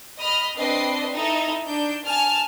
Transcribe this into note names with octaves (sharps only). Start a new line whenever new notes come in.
D#5 B5 D#6 F6
C4 D4 B4 D#5 C7
D#4 E4 A4
D4 D#4 G6
G#5 A5 F6